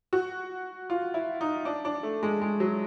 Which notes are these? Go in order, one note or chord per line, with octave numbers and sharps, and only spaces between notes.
F#4
F4
E4
D#4
D4
D4
A3
G#3
G#3
F#3